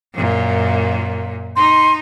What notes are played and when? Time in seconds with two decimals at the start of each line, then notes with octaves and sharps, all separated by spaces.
0.13 F#2 A#2
1.56 D#4 C6